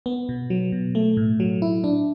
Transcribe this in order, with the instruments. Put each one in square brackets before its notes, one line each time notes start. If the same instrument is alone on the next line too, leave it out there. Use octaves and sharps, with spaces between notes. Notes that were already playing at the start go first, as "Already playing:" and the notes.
[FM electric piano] B3
B2
F#3
B2
A3
A2
F#3
E4
D4